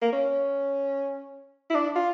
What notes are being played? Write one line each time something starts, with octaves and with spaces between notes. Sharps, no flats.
A#3
C#4
E4
D4
F4